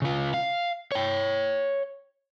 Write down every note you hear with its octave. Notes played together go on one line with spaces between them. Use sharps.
C#3 F4
F5
C#5 G5